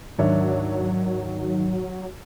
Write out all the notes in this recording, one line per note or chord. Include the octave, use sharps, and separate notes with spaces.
D2 G#2 D#3 F#3 D4 C#5 E5